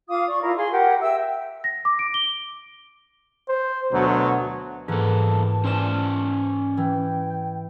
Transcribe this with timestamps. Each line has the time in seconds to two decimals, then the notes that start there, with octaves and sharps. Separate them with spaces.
0.08 F4 F5 D6 D#6
0.27 D5 C#6
0.41 E4 F4 A#4
0.56 G#4 F5 G#5 C6
0.71 G4 A#4 F#5 G5
1.00 E5 G5 E6
1.64 A#6
1.85 D6
1.99 D7
2.14 G7
3.49 C5
3.92 D2 B2 F#3 C5
4.88 E2 G#2 E3 A#3 B3 A4 A5
5.64 C#4 C5 D5 C6 E7
6.77 E3 G5